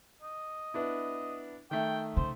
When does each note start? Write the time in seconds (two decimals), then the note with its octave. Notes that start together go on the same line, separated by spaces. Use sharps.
0.22 D#5
0.74 B3 D4 E4
1.71 D#3 A3 E5 G5
2.17 C#3 C5